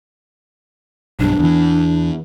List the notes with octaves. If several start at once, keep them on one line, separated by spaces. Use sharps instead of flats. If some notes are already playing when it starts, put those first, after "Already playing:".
B1 G2 D4
E2 E3